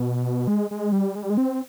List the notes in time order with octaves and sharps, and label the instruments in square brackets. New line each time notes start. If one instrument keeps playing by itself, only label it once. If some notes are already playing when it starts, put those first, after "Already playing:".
Already playing: [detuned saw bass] B2
G#3
G#3
G3
G#3
G3
G#3
C4